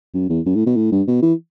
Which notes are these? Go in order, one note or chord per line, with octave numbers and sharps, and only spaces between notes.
F#2
E2
F#2
A2
B2
A2
G2
B2
E3